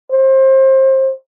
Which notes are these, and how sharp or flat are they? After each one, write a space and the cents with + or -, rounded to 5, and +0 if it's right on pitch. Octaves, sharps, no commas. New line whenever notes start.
C5 +30